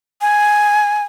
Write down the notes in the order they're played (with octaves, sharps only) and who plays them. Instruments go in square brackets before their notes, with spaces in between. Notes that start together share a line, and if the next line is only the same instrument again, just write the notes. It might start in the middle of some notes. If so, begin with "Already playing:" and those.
[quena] G#5